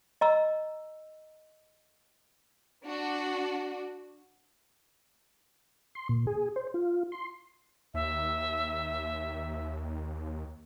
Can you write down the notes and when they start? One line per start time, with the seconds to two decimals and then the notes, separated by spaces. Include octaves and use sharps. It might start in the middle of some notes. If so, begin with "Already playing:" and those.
0.21 D#5 A#5 E6
2.85 D4 F#4
5.95 C6
6.09 A#2
6.27 G#4
6.56 C5
6.74 F4
7.12 C6
7.94 D#2 E5